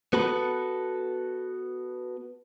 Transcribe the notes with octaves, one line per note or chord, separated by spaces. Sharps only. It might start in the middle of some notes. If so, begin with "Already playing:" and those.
B3 F#4 A4 B4